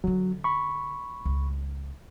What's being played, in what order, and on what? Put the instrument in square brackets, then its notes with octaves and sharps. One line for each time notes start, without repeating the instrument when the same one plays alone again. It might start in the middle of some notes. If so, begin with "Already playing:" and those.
[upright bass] D3 C#4 [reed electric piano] F#3
[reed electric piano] B5 C#6
[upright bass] C#2